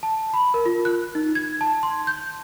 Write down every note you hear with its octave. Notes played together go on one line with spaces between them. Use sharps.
A5
B5
A#4
F4
F#6
D#4
G#6
A5
C6
G6